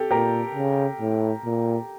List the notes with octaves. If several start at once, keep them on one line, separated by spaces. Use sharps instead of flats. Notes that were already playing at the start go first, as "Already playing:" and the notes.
Already playing: G4 A4
A#2 G4 A#4
C#3
A2
A#2